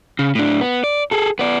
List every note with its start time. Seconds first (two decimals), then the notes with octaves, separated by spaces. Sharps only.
0.19 C#3
0.35 A2 D4
0.61 B3
0.84 D5
1.11 G#4 A4
1.39 B3 D5